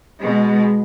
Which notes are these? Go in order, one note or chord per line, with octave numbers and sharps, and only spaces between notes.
B2 G#3